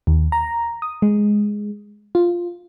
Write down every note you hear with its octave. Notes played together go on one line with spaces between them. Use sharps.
D#2
A#5
D#6
G#3
F4